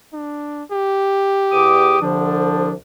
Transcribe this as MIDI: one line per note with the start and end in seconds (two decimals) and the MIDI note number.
0.13 0.63 62
0.72 2.00 67
1.52 1.97 40
1.52 1.97 86
1.52 1.97 87
2.02 2.72 36
2.02 2.72 50
2.02 2.72 53
2.02 2.74 62